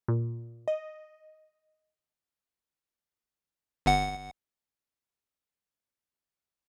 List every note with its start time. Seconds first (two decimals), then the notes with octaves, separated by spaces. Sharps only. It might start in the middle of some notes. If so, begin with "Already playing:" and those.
0.08 A#2
0.68 D#5
3.86 G1 F#5